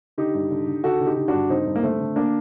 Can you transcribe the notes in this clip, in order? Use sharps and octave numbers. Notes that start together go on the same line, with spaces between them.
D3 D#4 G4
G2
D3
D3
D3 F#4 A4
D3
D#4 G4
D3
D4 F#4
G2
D3 C4 D#4
G2
A#3
D3 A3 C4
D3
A#3 D4